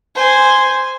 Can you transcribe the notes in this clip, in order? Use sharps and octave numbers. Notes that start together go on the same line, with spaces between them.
C5 G#5